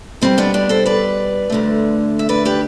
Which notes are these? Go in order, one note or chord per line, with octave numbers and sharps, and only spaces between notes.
B2 G3 C4
B3 D4
B3 D4
A4 C5
B4 D5
D2 D3 A3
E5
B4 D5
G4 B4